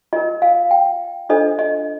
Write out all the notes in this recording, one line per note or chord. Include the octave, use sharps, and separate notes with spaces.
F4 A#4 D#5
F5
G5
D4 F4 A4 C5 D#5
D#5